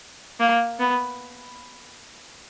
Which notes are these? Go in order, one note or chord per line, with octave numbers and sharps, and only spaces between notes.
A#3
B3